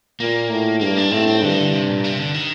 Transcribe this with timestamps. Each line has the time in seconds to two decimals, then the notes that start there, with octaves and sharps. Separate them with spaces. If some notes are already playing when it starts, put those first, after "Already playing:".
0.20 A#2 A#3
0.51 A2
0.81 G2 A#3
0.97 D4
1.12 A2 C4
1.27 C4
1.42 G2 D3
1.50 D#3
1.58 D3
1.73 C3
1.89 A#2
2.04 C3
2.19 D3
2.34 D#3